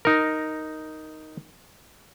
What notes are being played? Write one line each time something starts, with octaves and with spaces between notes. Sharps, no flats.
D#4 A#4